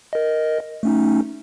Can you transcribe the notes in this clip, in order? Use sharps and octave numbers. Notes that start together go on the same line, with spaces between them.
A#4 D#5
A3 C#4 D#4